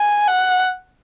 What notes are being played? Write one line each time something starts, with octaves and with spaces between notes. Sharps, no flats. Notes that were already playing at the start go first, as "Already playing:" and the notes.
Already playing: G#5
F#5